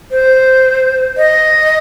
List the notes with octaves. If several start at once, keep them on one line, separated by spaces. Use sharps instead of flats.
C5
D#5